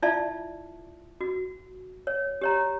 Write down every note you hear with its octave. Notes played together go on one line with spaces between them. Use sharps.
E4 F4 D5 E5 A5
F#4
C#5
G4 C#5 A#5